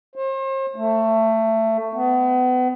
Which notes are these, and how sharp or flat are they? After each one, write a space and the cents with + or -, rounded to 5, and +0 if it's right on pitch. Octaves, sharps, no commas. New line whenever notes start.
C5 +40
A3 +20
B3 +35